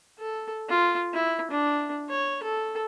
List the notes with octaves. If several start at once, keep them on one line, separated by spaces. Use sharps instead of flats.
A4
F4
E4
D4
C#5
A4